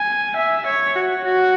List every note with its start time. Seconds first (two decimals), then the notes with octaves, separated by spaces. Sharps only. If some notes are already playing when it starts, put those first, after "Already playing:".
Already playing: G#5
0.36 E5
0.66 C#5
0.96 F#4
1.24 F#4